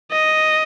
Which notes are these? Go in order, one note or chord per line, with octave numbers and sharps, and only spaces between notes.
D#5